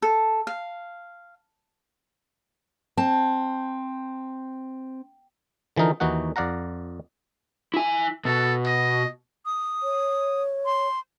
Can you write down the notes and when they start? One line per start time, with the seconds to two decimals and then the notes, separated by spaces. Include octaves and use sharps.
0.02 A4
0.47 F5
2.97 C4 A5
5.76 D3 E3 F3 D#4 A#4
6.00 D#2 E3 D#4 F#4 F#5
6.36 F2 D5 F5 F#5 A#5
7.74 E4 G#5
8.25 B2 A4
8.66 D#5
9.45 D#6
9.83 C#5
10.65 C6